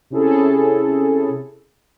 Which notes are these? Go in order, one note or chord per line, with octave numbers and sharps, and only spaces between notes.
C3 C#4 E4 G#4 A4